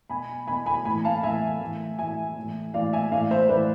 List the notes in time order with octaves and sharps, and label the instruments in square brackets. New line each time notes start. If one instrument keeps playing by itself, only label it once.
[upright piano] B2 G#5 B5
B2 G#5 B5
G#5 B5
A2 E3 G#5 B5
F5 A5
A2 E3 E5 G#5
A2 E3
A2 E3 E5 G#5
A2 E3
A2 E3 D5 F5
E5 G#5
A2 E3 D5 F5
C5 E5
A2 E3 B4 D5